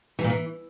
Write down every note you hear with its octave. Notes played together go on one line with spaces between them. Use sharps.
E3
A#2
E3